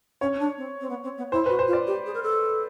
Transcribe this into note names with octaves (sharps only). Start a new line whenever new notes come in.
C#4 C#5
C#4
D4
C4
C4
B3
C4
B3
E4 C5
F#4 B4
C5
F4
D5
G4
G#4
A#4
A4